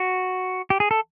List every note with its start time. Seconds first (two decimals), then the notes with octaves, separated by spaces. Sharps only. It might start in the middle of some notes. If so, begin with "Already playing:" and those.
Already playing: F#4
0.70 G4
0.80 G#4
0.91 A4